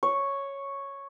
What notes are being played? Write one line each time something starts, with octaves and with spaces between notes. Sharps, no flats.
C#5